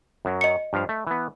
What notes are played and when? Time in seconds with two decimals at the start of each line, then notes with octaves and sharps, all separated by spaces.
0.25 F#2 F#3
0.41 D#5 C#7
0.73 G2 F3 F5
0.89 A3
1.07 E3 B3